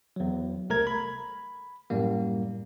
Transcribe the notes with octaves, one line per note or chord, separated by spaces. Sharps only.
E2 F#3
C2 A3 A#4 A#5 G#6
B5
F#2 A2 G3 A#3